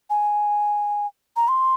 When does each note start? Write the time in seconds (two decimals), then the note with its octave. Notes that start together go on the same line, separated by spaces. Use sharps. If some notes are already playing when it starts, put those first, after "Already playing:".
0.10 G#5
1.36 A#5
1.48 C6